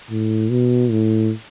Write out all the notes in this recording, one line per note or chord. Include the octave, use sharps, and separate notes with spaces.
A2
B2
A2